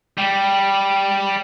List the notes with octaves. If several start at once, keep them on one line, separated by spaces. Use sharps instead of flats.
G3